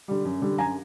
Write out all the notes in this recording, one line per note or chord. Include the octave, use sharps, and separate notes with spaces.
D3 G3
F#2
D3 G3
F#2 G#5 A#5